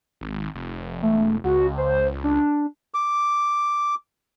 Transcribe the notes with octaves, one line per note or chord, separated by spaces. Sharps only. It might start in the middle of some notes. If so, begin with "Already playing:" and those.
G#1
F1
E1 A3
C#2 F#4
C5
D4
D6